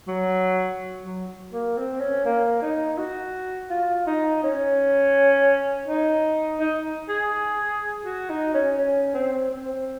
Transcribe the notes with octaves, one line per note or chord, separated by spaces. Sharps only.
F#3
F#3
A#3
C4
C#4
A#3
D#4
F#4
F4
D#4
C#4
D#4
D#4
G#4
F#4
D#4
C#4
C#4
C4
C4